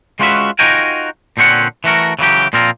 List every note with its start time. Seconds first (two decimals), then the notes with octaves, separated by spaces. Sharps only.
0.19 G#3 C#4 F4 F#4 B4 E5
0.59 D#4 F4 F#4 A#4 G5 G#5
1.37 A#2 D3 C4 C#4 F#5
1.84 E3 A3 F#4 A#4
2.19 C#3 E3 F#3 G4
2.53 A#2 F3 C4 F4 A#4